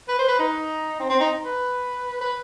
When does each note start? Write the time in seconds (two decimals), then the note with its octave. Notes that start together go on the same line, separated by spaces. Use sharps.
0.08 B4
0.19 C5
0.28 B4
0.39 D#4
1.00 C4
1.10 C4
1.20 D#4
1.45 B4
2.21 B4